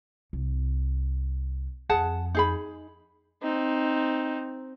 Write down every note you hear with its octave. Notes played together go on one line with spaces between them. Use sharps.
C2
F2 G#4 F#5 A5
D#4 G#4 B5
C4 D#4